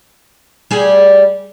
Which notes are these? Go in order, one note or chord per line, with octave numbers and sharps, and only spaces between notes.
G3 G#4